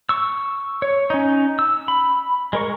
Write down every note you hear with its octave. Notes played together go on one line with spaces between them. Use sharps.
C#6 E6
C#5
C#4 D#4
E6
B5
G#3 A#4 C#6